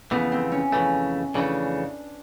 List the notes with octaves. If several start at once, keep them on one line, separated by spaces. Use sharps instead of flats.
F2 C#3 E3 A3 B3
C4
C#4
F2 C#3 E3 A3
F2 C#3 E3 A3 D4